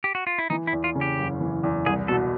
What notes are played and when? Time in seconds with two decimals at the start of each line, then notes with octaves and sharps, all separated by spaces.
0.04 G4
0.15 F#4
0.27 F4
0.39 E4
0.50 E3 D#4
0.67 E4
0.73 E2
0.84 F4
0.95 C#3
1.01 G4
1.18 F#1
1.41 E3
1.63 E2
1.86 C2 G#4
2.08 B2 A4